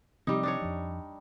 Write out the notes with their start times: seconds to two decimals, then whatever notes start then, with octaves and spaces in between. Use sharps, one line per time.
0.27 C3 F3 G3 C4 D#4
0.43 D4 D#4 C#5
0.62 F2 F3